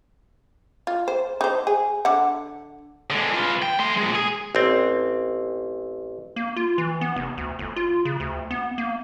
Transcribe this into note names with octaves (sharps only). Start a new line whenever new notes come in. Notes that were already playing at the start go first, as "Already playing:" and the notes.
F4
C5
D#4 C5
G#4
D3 F#5
D3 G#3
F4 B4
G5
A3 C6
A#2 G#3
G#4
A1 C4
A#3
F4
E3
B3
F1
D2
G1
F4
C#3
D2
B3
A#3